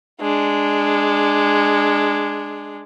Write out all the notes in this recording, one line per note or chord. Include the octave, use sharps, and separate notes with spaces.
G#3 D4